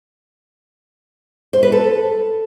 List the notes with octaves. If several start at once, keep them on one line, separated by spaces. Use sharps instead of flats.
C5
B4
A4